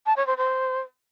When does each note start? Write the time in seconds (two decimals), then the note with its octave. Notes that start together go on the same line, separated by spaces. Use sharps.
0.06 A5
0.16 C#5
0.27 C5
0.37 C5